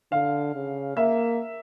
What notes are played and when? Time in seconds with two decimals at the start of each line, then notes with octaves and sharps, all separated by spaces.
0.12 D3 F5
0.55 C#3
0.96 A#3 E5